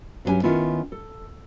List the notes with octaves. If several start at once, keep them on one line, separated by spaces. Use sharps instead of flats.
G2 F#3 G3 C#4 G4 G#5
D#3 B3 C#4 E4 F4
A4